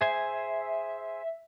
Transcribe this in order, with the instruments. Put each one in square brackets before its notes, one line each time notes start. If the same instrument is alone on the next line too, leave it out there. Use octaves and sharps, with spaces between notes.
[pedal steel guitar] G#4 C5 G#5 [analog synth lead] E5